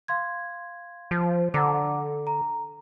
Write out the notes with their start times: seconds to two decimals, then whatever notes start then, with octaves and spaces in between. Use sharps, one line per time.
0.08 F5 C6 G#6
1.11 F3
1.54 D3 F#5 A#5 D6
2.27 A#5